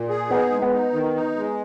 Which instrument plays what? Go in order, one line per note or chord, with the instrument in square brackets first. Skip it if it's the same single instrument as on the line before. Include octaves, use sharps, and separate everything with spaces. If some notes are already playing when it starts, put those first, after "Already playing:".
Already playing: [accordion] A#2
G#4
[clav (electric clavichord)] B3 [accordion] D#4
[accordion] G#3
[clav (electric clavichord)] B3
[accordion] D#4
D#3
D#4
G#3